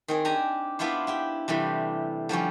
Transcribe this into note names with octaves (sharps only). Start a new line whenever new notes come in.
D#3 C4 G#4
D4 G4 G#5 A#5
B3 D4 E4 F4 C5
E4 G4 G5
C3 E3 G3 A3
D3 F3 G3 C#4